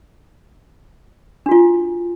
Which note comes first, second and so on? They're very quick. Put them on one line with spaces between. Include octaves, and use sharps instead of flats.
D4 F#4 F4